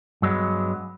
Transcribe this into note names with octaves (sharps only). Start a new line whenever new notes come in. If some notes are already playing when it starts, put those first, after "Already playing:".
G2 F#3 G#3 B3